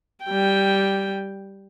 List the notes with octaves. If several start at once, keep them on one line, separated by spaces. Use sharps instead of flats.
G3 G5